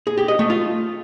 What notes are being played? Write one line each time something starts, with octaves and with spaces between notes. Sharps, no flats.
G#4
G4
D#5
A3
F4